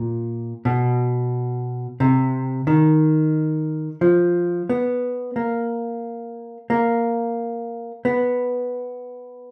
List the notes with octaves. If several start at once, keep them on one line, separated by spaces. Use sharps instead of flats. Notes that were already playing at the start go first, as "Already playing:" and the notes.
Already playing: A#2
B2
C3
D#3
F3
B3
A#3
A#3
B3